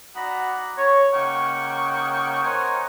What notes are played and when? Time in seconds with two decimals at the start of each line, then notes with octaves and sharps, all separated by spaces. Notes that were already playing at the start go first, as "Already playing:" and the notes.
0.16 D#4 F#4 D5 F#5 A#5 B5
0.77 C#5
1.13 C#3 A#3 D#4 F#5 G5 C#6
2.43 A#4 C5 C#5 D#5 F#5 G#5